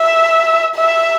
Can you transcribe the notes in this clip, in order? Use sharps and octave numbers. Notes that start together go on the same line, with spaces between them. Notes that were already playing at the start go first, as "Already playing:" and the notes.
Already playing: E5
E5